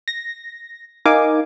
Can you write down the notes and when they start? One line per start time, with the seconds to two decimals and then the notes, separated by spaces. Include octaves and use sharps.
0.08 A#6
1.06 D#4 A#4 F5 G#5 D6